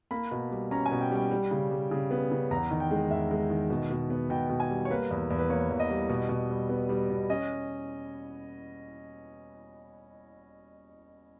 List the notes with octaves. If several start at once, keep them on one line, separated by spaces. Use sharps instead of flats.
A#3 B5
B2
G3
C#4 A#5
G#5
B2
G5
G3 G5
G3
C#3
G3
C#3
B3
C#3
E2 A#5
D#3
G5
G#3
E2 E5
G#3
D#3
B2
B2
B3
B2 G5
B2
G#5
G3
C#5
A#3 B4
E2
E2
B4
A#3 C#5
E2
D#5
G3
B2
B2
G3
B3
G3
B2
C#4 D#5